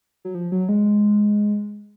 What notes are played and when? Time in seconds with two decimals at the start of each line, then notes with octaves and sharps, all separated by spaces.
0.25 F#3
0.35 F3
0.52 F#3
0.69 G#3